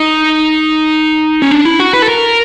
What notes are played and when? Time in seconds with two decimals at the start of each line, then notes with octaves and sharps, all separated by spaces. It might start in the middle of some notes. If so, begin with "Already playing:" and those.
Already playing: D#4
1.42 C#4
1.51 D4
1.65 E4
1.80 F#4
1.93 B4
2.02 A4
2.08 A#4